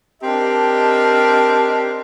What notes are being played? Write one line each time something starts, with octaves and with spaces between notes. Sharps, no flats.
C4 D4 G4 A#4 D#5 A5